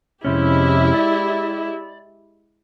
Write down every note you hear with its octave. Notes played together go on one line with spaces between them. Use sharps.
F2 C3 G#3 C#4 E4 G4
D5